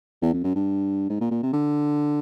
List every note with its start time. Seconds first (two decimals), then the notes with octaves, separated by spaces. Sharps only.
0.22 E2
0.33 F2
0.44 F#2
0.55 G2
1.10 G#2
1.21 A#2
1.31 A#2
1.43 C3
1.53 D3